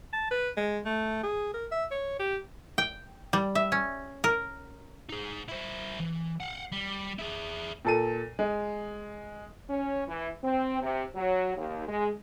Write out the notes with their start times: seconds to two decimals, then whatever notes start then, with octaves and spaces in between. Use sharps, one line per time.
0.13 A5
0.31 B4
0.57 G#3
0.85 A3
1.23 G#4
1.54 A#4
1.71 E5
1.91 C#5
2.19 G4
2.78 G5
3.33 G3
3.55 E5
3.72 C#4
4.24 A#4
5.10 D#4 G#4
5.48 E4 C5
5.99 E3
6.40 F5 F#5
6.72 G3
7.19 E4 G#4
7.85 A#2 A4 D#7
8.39 G#3
9.69 C#4
10.08 E3
10.43 C4
10.81 C3
11.15 F#3
11.56 D#2
11.88 G#3